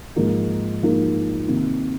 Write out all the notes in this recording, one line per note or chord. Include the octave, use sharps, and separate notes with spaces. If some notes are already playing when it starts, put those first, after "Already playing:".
G#2 F3 A#3 D#4 A#4
G#2 F3 A#3 D#4 A#4
C3 D#3 A#3